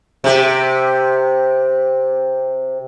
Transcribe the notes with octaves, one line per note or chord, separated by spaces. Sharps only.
C3 G4